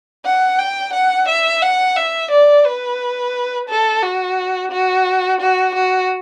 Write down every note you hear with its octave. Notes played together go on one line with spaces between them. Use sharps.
F#5
G5
F#5
E5
F#5
E5
D5
B4
A4
F#4
F#4
F#4
F#4